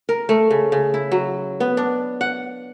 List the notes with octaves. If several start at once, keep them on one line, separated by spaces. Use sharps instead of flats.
A#4
A3
C#3
C#3
E4
F#3
B3
D4
F#5